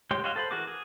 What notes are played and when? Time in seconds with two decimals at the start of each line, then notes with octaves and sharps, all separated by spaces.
0.11 G#3 G4 C#5 G5 C6
0.24 F#4 C#5 D#5 F5 C6
0.36 A4 C5 B5
0.51 E3 F#4 G#4 A#4 D6
0.67 G#4